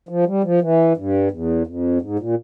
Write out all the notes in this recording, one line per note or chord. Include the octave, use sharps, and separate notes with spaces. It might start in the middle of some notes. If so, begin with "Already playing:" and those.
F3
G3
F3
E3
G2
E2
F2
G#2
A#2